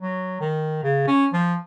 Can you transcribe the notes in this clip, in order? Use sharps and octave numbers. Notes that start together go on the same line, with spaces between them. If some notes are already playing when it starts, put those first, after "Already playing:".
F#3
D#3
C#3
C#4
F3